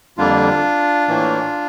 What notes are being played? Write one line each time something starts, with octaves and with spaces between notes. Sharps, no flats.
F2 D3 G3 A#3 D4 F4
A2 E3 A#3